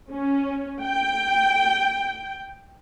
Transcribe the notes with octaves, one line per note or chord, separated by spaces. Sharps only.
C#4
G5